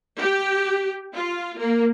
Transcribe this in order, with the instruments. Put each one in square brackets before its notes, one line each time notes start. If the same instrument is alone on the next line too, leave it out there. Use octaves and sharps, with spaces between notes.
[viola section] G4
F4
A#3